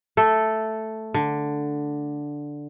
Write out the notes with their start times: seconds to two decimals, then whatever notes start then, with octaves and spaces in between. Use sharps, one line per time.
0.17 A3 A4
1.14 D3